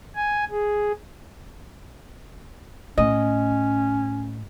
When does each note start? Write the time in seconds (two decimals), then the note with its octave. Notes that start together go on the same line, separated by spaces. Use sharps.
0.15 G#5
0.50 G#4
2.98 A2 C#4 D#5